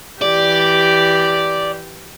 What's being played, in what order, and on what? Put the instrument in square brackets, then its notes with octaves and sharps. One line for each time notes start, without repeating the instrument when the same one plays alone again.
[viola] E3 G4 [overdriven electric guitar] D5